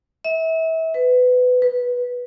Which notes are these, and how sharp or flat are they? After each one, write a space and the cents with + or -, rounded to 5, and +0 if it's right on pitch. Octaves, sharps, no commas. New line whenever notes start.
E5 -30
B4 +20
B4 -10